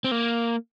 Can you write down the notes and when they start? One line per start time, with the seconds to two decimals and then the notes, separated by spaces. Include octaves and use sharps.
0.04 C4
0.11 A#3